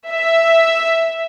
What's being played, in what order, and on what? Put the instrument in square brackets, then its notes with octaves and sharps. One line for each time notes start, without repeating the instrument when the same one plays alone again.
[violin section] E5